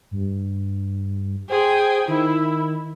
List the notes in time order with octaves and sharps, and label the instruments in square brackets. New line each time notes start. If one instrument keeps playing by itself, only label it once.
[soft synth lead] G2
[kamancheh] G#4 G5 [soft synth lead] C5
[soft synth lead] D#3 [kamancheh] E4